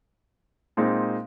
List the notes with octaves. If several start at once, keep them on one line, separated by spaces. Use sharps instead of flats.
A#2 G#3 C4 D#4